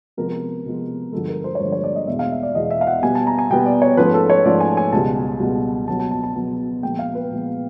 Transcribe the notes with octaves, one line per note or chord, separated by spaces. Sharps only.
C3 F3 G#3 B3 A#4
C3 F3 G#3 B3
G2 D3 F3 G#3 A4
A#4
C5
C#5
G2 D3 F3 G#3 C5
C#5
D5
D#5
E2 B2 G#3 E5
F5
E5
D5
E2 B2 G#3 D#5
E5
F5
F#5
B2 G3 B3 G#5
A5
A#5
G#5
B2 G3 B3 G5
D5
C#5
G#2 F3 A3 C#4 B4
A4
C#5
G#2 F3 A3 C#4 D5
G#5
G#5
C#2 B2 G3 A5
C#2 B2 G3
B2 F#3 B3 A5
A5
A5
A5
B2 F#3 B3
A#2 F3 G#3 B3 G5
F5
B4
A#2 F3 G#3 B3